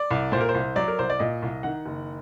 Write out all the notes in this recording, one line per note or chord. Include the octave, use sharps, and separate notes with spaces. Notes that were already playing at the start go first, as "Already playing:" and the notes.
Already playing: D5
C2
A#2 C5
A#4
C5
C2
F#3 D5
A#4
C2 C5
D5
A#2 D#5
C2
D#3 F#5
F#1